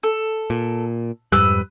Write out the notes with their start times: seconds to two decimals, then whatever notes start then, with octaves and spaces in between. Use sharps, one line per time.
0.03 A4
0.50 A#2
1.32 F2 G#2 G3 B4 E6 F#6